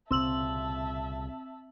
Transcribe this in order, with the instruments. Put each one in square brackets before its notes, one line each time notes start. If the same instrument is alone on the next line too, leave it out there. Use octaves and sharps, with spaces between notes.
[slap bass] C2 A#2 C#3 [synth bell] C4 E6 F#7 [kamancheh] E5 A5